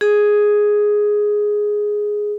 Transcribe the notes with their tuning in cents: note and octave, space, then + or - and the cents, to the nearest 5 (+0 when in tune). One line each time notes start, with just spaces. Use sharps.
G#4 +5